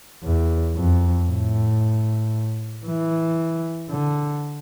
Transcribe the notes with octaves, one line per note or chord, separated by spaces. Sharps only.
E2
F2
A2
E3
D3